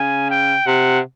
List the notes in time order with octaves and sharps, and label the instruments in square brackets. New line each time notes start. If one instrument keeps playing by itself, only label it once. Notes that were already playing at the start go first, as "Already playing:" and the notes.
Already playing: [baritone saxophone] C#3 [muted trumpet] G#5
[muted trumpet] G5
[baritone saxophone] C3 [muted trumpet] F#5